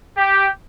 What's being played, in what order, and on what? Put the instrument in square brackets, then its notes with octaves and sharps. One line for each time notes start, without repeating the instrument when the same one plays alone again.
[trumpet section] G4